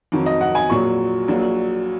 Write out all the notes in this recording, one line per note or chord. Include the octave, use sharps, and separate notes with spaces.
F2 D#3 F#3
D#5
F#5
G#5
A#1 A#2 F#3 C#6
A#1 A#2 F#3